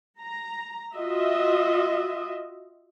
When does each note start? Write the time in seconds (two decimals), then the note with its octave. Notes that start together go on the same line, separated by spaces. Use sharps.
0.21 A#5
0.95 F4 F#4 D#5 E5